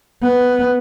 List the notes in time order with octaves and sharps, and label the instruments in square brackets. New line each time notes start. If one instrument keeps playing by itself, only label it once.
[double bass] B3